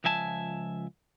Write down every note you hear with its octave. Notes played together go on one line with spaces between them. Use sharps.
C#2 F3 E5 G#5 A5